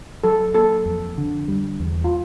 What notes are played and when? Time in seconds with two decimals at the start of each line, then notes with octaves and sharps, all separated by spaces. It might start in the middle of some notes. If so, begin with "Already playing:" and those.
0.24 F#3 A4
0.54 A#3 A4
0.86 F2
1.18 D3
1.48 G3
1.80 E2
2.04 F4